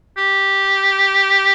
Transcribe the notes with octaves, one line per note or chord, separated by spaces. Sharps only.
G4